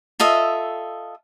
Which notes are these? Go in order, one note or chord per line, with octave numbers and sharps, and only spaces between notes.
F4 A4 D#5 E5